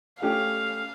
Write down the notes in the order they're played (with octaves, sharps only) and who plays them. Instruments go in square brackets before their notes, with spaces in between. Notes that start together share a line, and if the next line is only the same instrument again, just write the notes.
[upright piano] A3 C#4 G4 [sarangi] F5